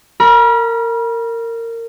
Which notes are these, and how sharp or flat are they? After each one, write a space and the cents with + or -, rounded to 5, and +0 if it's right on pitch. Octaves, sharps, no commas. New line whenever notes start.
A#4 -20 B5 -45